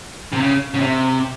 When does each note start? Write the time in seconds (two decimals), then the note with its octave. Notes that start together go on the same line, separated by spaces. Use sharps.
0.33 C3
0.40 C#3
0.74 C#3
0.81 C3